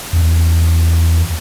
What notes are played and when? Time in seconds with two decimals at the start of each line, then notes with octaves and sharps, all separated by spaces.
0.13 E2